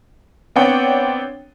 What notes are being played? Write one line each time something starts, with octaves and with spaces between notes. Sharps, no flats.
B3 C4 D4 C#5 F#5 G5